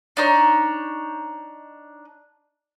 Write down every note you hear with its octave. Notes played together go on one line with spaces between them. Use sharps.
D4 D#4 C#5